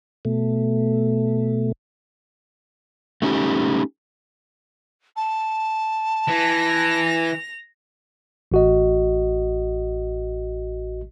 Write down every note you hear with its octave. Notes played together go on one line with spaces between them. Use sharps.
B2 A3
A3 C#4 D#4 G4
A5
E3 A#6 F7
A1 F#4 D#5